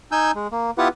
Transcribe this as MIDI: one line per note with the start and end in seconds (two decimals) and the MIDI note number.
0.12 0.31 63
0.12 0.31 80
0.12 0.31 88
0.12 0.31 91
0.35 0.47 56
0.52 0.71 58
0.78 0.88 59
0.78 0.88 64
0.78 0.88 65
0.78 0.88 67
0.78 0.88 71
0.78 0.88 78